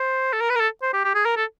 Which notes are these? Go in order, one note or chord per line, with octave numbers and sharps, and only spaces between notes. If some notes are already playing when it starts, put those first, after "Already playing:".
Already playing: C5
A4
A#4
B4
A#4
A4
C5
G4
G4
G#4
A#4
A4